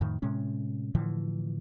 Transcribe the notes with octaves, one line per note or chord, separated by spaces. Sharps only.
F2 A2 D#3
A2 C3 G#3 C#4
A2 D3 E3 F3